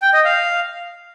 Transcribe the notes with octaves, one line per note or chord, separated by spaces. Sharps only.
G5
D#5
F5